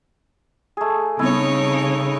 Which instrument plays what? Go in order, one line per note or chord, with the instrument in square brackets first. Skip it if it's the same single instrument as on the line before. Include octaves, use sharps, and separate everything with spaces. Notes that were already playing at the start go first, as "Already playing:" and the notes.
[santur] A3 G#4
[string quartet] C#3 D#4 C#5 [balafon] G3 B3 C4 [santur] E4